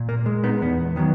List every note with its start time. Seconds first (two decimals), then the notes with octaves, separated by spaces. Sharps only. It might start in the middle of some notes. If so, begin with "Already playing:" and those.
Already playing: A#2
0.09 A#3
0.26 G#3
0.44 B3 D#4
0.61 E2 B3
0.96 D#3 F#3 B3